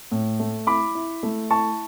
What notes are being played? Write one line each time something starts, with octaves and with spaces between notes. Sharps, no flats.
A2
A3
E4 B5 D6
E4
A3
E4 A5 C#6